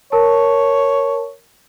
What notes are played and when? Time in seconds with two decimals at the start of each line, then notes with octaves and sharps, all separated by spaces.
0.12 A#4 C#5 A5